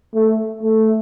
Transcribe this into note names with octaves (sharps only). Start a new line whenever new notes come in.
A3
A3